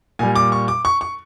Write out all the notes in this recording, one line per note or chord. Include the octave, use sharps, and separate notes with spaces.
A#2 G3 G#5
D6
C#6
D6
C#6
C#6